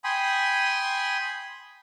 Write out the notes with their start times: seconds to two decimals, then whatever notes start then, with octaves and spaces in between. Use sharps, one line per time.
0.04 G5 G#5 B5 C6 D#6